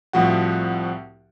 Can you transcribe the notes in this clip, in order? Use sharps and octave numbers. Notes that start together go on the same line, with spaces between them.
C2 A2 F3 F#4 F#5